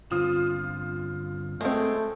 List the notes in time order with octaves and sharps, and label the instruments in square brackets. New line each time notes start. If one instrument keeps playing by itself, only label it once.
[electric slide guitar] G2 D3 C4 [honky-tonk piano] F4 D#6
[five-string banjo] G#3 C4 [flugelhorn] A3